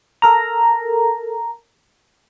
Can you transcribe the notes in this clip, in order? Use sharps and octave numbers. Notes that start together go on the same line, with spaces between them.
A4 A#4 A#5